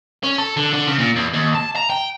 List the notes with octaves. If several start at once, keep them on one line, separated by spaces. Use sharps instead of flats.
C#4
A4
D3
D3
C#3
A#2
E2
D#2
A5
A#5
G5